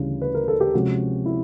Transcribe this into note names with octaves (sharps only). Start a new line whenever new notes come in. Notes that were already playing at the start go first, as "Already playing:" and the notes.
Already playing: D2 C#3 E3 G3
B4
A#4
A4
G4
C3 F3 G#3 C#4 F#4
E4